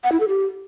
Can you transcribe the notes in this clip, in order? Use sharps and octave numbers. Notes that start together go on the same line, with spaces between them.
F#5
E4
A4
G4